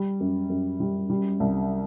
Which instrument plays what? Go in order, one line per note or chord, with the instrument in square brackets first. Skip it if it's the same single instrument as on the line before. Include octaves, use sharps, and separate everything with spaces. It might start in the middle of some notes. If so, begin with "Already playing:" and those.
Already playing: [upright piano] G3
F#2
F#2
G3
G3
C2